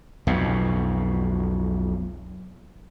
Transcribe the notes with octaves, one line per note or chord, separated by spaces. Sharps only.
B1 F2 B2